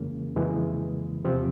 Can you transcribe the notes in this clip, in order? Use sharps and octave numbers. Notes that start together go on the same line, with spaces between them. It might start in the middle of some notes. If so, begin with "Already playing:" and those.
Already playing: F2 C#3 E3 G#3 A#3 C#4
F2 C#3 E3 G#3
E2 C3 F3 C4